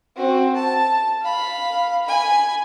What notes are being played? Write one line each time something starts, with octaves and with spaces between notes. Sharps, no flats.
C4 F#4
A5
F5 B5
G#5 B5